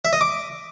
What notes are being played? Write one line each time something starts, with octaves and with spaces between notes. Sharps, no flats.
E5
D#5
D6